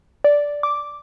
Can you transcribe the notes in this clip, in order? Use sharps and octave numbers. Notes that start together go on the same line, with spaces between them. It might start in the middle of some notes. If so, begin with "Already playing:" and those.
D5
D6